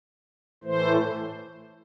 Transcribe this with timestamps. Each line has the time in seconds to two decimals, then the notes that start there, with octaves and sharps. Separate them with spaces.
0.64 A2 E3 A3 C5